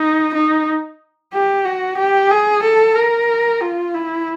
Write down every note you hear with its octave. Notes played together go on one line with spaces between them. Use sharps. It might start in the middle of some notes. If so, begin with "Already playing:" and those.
Already playing: D#4
D#4
G4
F#4
G4
G#4
A4
A#4
F4
E4